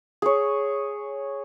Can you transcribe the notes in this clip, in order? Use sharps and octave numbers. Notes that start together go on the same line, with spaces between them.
G#4 C#5